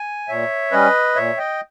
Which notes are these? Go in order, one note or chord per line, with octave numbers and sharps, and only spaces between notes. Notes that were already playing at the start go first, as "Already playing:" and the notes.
Already playing: G#5
A#2 C#5 E5
G3 C#4 B4 D#5
A#2 C#5 E5
D#5 G5